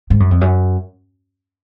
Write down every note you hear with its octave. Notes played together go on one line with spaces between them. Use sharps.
G#2
F#2
F2
F#2